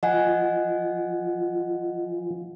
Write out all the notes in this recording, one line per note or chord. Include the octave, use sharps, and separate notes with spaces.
F3 D#5 F#5 G#5